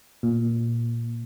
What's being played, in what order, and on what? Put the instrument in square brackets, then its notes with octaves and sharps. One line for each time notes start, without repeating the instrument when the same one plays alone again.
[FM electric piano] A#2